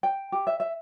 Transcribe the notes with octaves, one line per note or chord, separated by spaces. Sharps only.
G5
G4
E5
E5